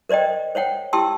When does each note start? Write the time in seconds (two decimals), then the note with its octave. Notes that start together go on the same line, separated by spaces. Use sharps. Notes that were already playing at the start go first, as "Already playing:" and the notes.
0.09 A#4 C5 D5 D#5 G5
0.55 C5 C#5 F#5 G5
0.93 E4 G4 G5 A5 C6 E6